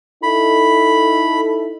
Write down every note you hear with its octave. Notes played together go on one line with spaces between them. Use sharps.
D#4 E4 A4 B5